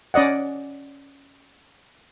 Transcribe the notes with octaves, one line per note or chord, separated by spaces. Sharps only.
C#4 D5 D#5 F#5